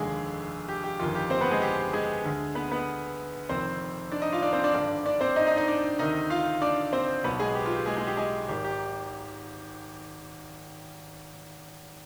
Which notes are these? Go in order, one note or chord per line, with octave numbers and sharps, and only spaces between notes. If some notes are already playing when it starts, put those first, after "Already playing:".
Already playing: F1 D#2 D3 G#3 G#4
G4
G4
G1 F2 D#3 F4
G4
C4 C5
B3 B4
G#3 G#4
G4
G#3 G#4
D2 D3
B3 B4
B3 B4
F1 F2 D#3 C4 C5
D4 D5
D#4 D#5
F4 F5
D4 D5
C4 C5
D4 D5
G#1 G2 D3 D4 D5
D4 D5
C4 C5
D#4 D#5
D#4 D#5
D#4 D#5
D4 D5
D2 C3 D#3 D#4 D#5
F4 F5
D4 D5
C4 C5
B1 B2 B3 B4
G#3 G#4
G4
F4
G4
G#3 G#4
G#3 G#4
G4
G#3 G#4
G#1 G#2 D#3 G4
G4